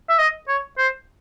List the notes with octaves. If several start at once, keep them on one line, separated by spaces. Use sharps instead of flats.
E5
D#5
C#5
C5